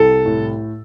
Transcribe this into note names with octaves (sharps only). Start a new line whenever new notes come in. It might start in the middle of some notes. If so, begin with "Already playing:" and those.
Already playing: C2 A4
A2